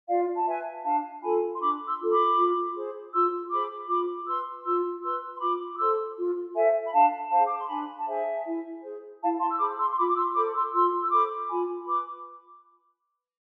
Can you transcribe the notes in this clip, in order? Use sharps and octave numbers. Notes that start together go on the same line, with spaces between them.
F4 D5 F5
A5
B4 E5 G#5
D4 F5 A5
F4 A4 G#5 B5
C6
D4 B5 D6
C6 E6
F4 A4
B5 D6
F4
G#4 C5
F4 C6 E6
G#4 C5 B5 D6
F4 B5 D6
B4 C6 E6
F4 C6 E6
B4 C6 E6
C6
F4 B5 D6
D6
A4 C5 C6 E6
F4
A4 C5 E5 G#5
B5
D4 F5 A5
G#4 C5 F5 A5
D6
C6
D4 G#5 B5
A5
G#4 C5 E5 G#5
E4
G#4 C5
E4 F5 A5
A5 C6
E6
G#4 C5 B5 D6
C6 E6
C6
F4 B5 D6
D6
C6 E6
A4 C5 B5 D6
C6 E6
F4 C6 E6
E6
A4 C5 B5 D6
F4 G#5 B5
B4 B5 D6